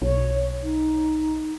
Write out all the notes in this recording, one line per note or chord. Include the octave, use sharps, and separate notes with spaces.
B1 C#5
D#4